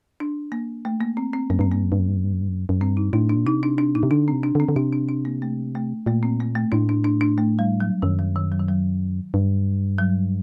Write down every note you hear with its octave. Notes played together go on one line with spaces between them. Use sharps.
D4
A#3
A3
A#3
C4
C4
F#2 A#3
G2 C4
F#2
G2 A#3
F#2
G2
F#2
G2
F#2
G2
F#2
G2
F#2
F#2
G2 C4
D#4
A2 D4
D4
A#2
C3 D#4
D4
D4
A#2 D#4
C3
D3 D4
C4
C3
D4
D3
C4
D3
C3 D4
D4
D4
A#3
A3
A3
A#2 A3
C4
A#3
A3
A2 D4
D4
D4
D4
A3
G3
F#3
F#2 D#3
F#3
D#3
F#3
D#3
F#3
G2
F#3